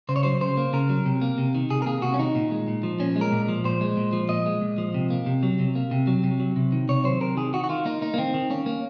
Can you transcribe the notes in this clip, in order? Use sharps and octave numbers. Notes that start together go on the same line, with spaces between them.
C#3 C5
C#5
F#3 C5
C#3 C5
A#3
C#3 A#4
F#3
C3
A#3
C3
D#3
C3 G#4
A#4
A#3 G#4
C3 F#4
C#4
D#3 D#4
A#2
G#3
A#2
F3
A#2 C#4
G#3
A#4
A#2
F3
A#2 C5
G#3
A#2
F3
A#2 D#5
G#3
A#2
F3
C3
A#3
C3
F#3
C3
A#3
C3
F#3
C3
F#3
C3
D#3
C3 C#5
F#3 C5
C3 A#4
D#3 G#4
D#3 F#4
F#4
D#3 F4
A#3 D#4
A#3 D#4
A#3
D#3 C4
D#3
A#3 C#4
A#3